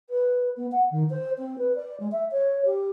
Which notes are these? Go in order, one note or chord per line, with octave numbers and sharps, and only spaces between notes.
B4
B3
F#5
D#3
C5
C4
B4
D5
G#3
E5
C#5
G4